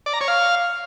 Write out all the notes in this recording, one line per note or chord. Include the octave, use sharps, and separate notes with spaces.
D5
A#5
C#5
F5